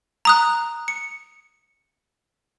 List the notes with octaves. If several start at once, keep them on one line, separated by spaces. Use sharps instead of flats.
A#5 D#6 F#6
C#7